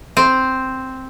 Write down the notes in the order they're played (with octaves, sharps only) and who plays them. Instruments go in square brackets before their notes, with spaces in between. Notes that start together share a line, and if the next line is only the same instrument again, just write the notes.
[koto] C4